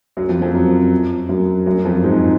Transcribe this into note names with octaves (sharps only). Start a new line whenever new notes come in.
F#2 F#3
F2 F3
F2 F3
F#2 F#3
F#2 F#3
F#2 F#3
F2 F3
G#2 G#3